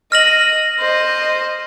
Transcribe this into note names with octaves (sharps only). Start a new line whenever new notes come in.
D#5 F6 A#6 F#7
C5 D#5